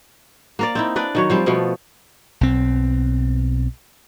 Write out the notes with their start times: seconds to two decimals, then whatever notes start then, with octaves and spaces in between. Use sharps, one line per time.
0.59 A#3 A#4 D5
0.75 C4 D#4 E4
0.96 D4 B4 D5
1.15 D#3 F#3 C#5
1.30 F3 G3 C4
1.46 B2 F3 A3 B3
2.41 B1 C4